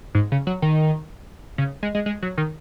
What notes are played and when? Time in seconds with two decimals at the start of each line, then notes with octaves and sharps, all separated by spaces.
0.15 G#2
0.32 C#3
0.47 F#3
0.62 D#3
1.58 C#3
1.83 G#3
1.95 G#3
2.06 G#3
2.22 F#3
2.38 D#3